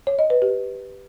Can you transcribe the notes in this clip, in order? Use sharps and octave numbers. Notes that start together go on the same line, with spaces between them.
C#5
D#5
B4
G4